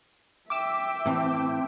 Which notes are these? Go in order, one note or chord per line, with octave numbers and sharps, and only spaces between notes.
E5 G5 D6 E6
A2 E3 C4